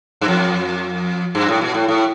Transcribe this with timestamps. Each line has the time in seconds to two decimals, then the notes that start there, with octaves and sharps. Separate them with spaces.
0.21 G2
0.28 F2
1.35 G2
1.48 A2
1.61 B2
1.74 A2
1.88 A2